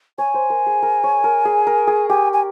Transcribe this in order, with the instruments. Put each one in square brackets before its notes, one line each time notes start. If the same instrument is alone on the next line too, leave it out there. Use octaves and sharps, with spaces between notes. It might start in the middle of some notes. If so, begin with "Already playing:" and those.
[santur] C#5 [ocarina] G#5
[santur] C5
A#4
G#4
A#4
C#5
A#4
G#4
A#4
G#4
[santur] G4 [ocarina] G#5
[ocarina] G#5